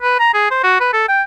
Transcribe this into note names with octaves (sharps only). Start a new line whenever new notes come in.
B4
A#5
G#4
C5
F#4
B4
A4
G5